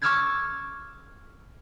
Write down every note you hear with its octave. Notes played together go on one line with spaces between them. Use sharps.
C#6 D6 E6 F6 G#6 A6